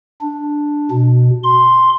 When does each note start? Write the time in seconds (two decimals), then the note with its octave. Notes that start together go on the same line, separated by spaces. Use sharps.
0.21 D4
0.91 B2
1.44 C6